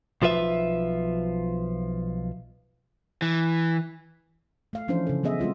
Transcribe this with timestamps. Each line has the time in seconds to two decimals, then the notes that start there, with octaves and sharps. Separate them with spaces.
0.22 B1 F3 F4 B4 E5
3.22 E3
4.73 A3 F5
4.88 E3 F3 C#4 D4 E4 C5
5.07 C#3 A4
5.23 F#3 B3 G#4 D#5 E5
5.39 G#3 C4 F4 F#4